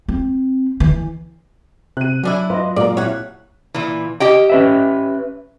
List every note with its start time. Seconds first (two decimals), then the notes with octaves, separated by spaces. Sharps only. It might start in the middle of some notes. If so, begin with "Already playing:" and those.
0.08 C4
0.80 E3
1.97 C3 F#6 D#7
2.23 F#3 C#4 D4 E4
2.50 F4 B4 D#5
2.76 A#2 G#3 F4 A#4 D5
2.97 C2 C#5 F#5
3.74 A#2 E3
4.20 G4 D#5 G5
4.49 C#4 B4 E5